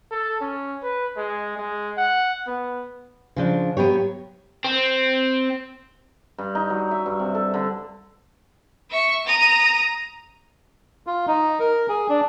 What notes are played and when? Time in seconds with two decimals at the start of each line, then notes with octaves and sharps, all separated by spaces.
0.11 A4
0.40 C#4
0.82 B4
1.17 G#3
1.58 G#3
1.97 F#5
2.47 B3
3.36 C#3 F3 D4
3.77 F#3 B3 G4 C#5
4.64 C4
6.38 G2
6.55 D#4
6.70 F#3
6.91 E5
7.06 G2
7.19 C3
7.35 A4
7.54 D3
8.90 E5 C#6
9.26 A#5 D#6
11.07 F4
11.27 D#4
11.60 A#4
11.89 G#4
12.09 D4